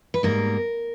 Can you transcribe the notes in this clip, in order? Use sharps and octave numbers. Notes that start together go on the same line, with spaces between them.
B4
G#2 G3 A#3 A#4